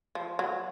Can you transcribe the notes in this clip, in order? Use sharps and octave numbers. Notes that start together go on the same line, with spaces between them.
F3
F#3